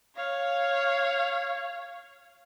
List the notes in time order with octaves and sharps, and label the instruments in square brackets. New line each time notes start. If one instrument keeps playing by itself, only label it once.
[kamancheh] C#5 F5